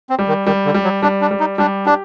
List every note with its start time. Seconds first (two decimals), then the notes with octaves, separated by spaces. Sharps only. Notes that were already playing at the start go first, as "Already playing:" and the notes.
0.10 C4
0.19 G3
0.28 D#3
0.46 D#3 G3
0.65 D3
0.74 G3
0.84 F#3
1.02 G3 D4
1.21 D4
1.31 G3
1.40 D#4
1.58 G3 D4
1.86 D4 G4